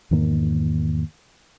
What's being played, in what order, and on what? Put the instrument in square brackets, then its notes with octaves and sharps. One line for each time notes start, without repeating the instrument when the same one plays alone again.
[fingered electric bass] E2 G#2 D#3 A#3